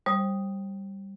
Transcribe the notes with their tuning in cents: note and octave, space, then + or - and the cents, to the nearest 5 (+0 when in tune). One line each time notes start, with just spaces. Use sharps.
G3 +0 C5 +30 D#6 +0